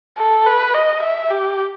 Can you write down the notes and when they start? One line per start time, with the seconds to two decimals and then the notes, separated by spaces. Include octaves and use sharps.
0.18 A4
0.46 B4
0.74 D#5
1.03 E5
1.30 G4